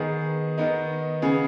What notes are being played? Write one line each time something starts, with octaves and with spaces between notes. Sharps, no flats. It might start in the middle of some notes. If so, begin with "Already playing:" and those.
Already playing: D#3 B3 G#4
D#3 B3 D#4
C#3 B3 G#4